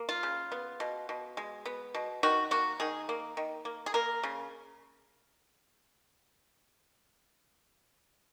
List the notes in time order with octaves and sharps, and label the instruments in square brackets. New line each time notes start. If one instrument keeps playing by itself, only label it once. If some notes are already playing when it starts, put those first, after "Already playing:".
Already playing: [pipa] A#3
F4
C#3
B3
B2
B2
G#3
B3
B2
D#3 F#4
A#3 F#4
D#3 G#4
A#3
D#3
A#3
G#4
A#3 A#4
C#3